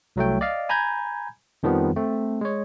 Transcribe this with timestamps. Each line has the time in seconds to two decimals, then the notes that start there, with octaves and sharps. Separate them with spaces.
0.16 C2 F#3 A3 G5
0.41 D5 D#5 F5
0.69 G#5 A#5 B5 G6 G#6
1.63 F2 D#3 F3 G3 B3
1.96 A3 C4
2.41 G#3 C#5